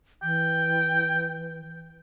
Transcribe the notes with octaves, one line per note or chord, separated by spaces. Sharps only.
E3 G5